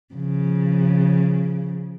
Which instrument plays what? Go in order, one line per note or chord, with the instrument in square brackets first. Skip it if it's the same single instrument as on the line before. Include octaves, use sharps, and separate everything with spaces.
[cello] C#3 F3